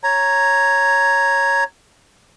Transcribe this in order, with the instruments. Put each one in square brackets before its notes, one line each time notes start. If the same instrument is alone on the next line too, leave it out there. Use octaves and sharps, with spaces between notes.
[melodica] C#5 A#5